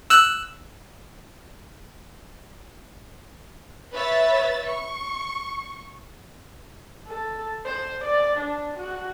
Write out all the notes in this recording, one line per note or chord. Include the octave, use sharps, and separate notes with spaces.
E6 F#6
B4 C#5 E5 A6
C#6
A4
C5
D5
D4
F#4